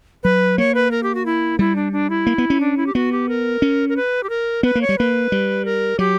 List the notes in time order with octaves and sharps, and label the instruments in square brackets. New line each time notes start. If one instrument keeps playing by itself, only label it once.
[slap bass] F#3 [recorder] B4
[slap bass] A#3 [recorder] C#5
[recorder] B4
A#4
G4
F#4
E4
[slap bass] G3 [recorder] E4
[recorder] D4
D4
E4
[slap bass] A#3
B3
C#4
[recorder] D4
E4
G4
[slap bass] B3 [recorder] F#4
[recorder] G4
A#4
[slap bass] C#4
[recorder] A#4
B4
G4
A#4
[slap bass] B3 [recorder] B4
[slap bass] A#3
[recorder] C#5
[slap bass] G3
[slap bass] A#3 [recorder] B4
[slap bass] G3
[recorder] A#4
[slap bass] F#3 [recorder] G4